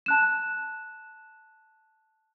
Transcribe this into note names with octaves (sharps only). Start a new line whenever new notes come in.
A5 F#6 E7